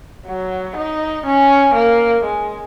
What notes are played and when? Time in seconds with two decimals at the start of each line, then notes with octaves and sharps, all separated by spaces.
0.27 F#3
0.77 D#4
1.26 C#4
1.75 A#3
2.25 G#3